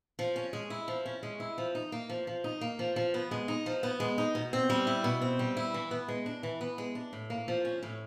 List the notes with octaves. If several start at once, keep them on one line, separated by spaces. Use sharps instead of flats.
F3
C#4
G#3
E4
F3
C#4
G#3
E4
F3
D#4
A#3
F3
F3
D#4
A#3
F3
F3
B3
G#3
D#4
F3
B3
G#3
D#4
B2
C4
G3
E4
B2
C4
G3
E4
E3
B3
G#3
D4
E3
B3
G#3
D4
A2
A#3
F3
C#4
A2